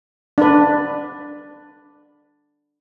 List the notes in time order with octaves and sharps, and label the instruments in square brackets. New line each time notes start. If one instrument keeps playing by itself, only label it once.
[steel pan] D4 B4